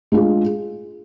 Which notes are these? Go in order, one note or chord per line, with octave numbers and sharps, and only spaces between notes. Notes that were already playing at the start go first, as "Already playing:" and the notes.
G#3 D4 F4 G#4